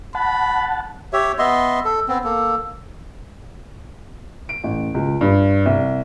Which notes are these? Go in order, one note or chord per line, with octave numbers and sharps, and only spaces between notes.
F#5 A5 B5
G4 C#5 E5
B3 D#5 E5 C6
A4
B3 C4
A#3 A4
D7
A1
C#2
G2
C2